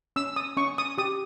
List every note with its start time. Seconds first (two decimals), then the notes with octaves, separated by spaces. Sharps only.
0.16 C#4 E6
0.36 D#6
0.57 C#4 C#6
0.78 D#6
0.98 G4 D#6